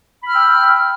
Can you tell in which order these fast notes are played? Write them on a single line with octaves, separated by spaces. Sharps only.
B5 F6 E6 G5